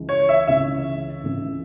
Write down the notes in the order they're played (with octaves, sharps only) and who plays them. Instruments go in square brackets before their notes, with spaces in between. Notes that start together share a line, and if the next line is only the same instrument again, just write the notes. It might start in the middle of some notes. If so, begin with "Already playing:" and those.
Already playing: [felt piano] C#2 C#3 E3
[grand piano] C#5
E5
[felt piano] C#2 C#3 E3 [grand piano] E5
[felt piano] C#2 C#3 E3